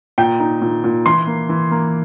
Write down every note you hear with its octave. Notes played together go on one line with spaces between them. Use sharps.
A#2 G5
D#4
A#2
A#2
E3 C6
A#3
E3
A#3